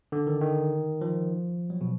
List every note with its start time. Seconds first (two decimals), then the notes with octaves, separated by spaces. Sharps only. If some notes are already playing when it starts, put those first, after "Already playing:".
0.12 D3
0.27 D#3
0.41 D#3
1.01 F3
1.70 F#3
1.81 B2